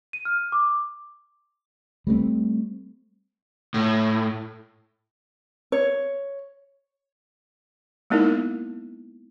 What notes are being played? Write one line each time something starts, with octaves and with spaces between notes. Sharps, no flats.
D#7
F6
D6
G3 A3 B3 C4
A2
C#5
G#3 A#3 B3 D#4 E4 A#4